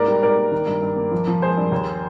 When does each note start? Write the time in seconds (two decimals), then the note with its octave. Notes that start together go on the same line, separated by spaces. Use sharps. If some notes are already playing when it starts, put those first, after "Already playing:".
Already playing: G#2 A#3 A#4 D5
0.08 G3
0.23 G#2 A#4 D5
0.38 A#3
0.52 D#3
0.67 G2
0.82 G2
0.97 A#3
1.11 F3
1.27 F3
1.42 G#3 G#4 C5
1.57 G2
1.72 D#2